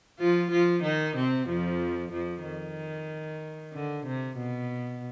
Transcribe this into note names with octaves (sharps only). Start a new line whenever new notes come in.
F3 F4
F3 F4
D#3 D#4
C3 C4
F2 F3
F2 F3
D#3
D3
C3
B2